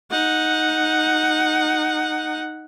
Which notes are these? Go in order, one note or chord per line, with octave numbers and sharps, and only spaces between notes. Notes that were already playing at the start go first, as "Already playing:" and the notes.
D#4 F#5